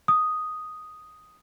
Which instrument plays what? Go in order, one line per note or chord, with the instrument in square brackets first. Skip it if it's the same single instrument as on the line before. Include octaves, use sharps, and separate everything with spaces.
[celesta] D#6